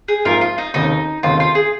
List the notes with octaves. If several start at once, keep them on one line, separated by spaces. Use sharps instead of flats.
G#4
A#1 G#2 F3 F4 A#4
F4
D#4
F1 D#2 C#3 D#4
F1 D#2 C#3 F4
F4
G#4